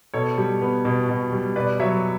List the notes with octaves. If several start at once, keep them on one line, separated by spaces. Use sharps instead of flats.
B2 A4 C#5
G3
B3
B2
B2
G3
B2 B4 D5
F#3 C#5 E5